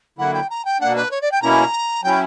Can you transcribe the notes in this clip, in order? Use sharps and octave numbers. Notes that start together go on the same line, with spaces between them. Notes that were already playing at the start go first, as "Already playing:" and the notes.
D3 F#3 A#3 E4 F#5
G5
A#5
G5
B2 A#3 D4 F#5
B4
C#5
D5
G5
B2 A#3 C#4 E4 A#5
F#3 C#4 E4 G5